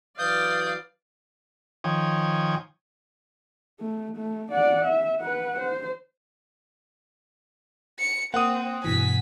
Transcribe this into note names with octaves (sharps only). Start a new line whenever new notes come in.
E3 F#3 B4 D5 F5 D#6 G6
D#3 F3 C#5 G5 G#5 D#6
A3
A3
D5 F#5
E5
B4 F#5
C5
C#7
A#3 C4 F#5 D#6
G2 B2 E3 G#5 B6